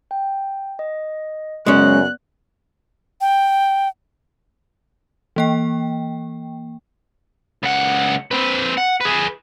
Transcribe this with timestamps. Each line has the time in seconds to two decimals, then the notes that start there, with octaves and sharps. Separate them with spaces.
0.11 G5
0.79 D#5
1.66 F#2 C#3 G#3 B3 C#4 D5 F#6
3.21 G5
5.36 E3 A#3 G5
7.63 C#2 F#5
8.31 C4 B4
8.78 F#5
9.01 G#4 B4